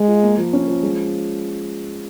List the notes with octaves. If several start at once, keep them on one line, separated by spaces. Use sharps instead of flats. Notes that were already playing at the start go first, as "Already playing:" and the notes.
Already playing: G#3
F4
A#3
F3
C#4
F3
G#3